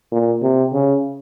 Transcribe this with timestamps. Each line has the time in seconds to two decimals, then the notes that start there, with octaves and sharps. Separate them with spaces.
0.12 A#2
0.42 C3
0.73 C#3